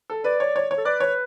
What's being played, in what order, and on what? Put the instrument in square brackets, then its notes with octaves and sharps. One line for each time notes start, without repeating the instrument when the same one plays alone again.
[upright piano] A4
[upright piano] B4 [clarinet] D5
[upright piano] C#5
C#5
C#5
[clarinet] A4
[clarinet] B4 [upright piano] D5
[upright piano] C#5